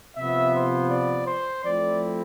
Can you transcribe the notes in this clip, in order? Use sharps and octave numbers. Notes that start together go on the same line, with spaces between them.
C3 F3 B3 E5
C5
D5
C5
F3 A3 C4 E4 D5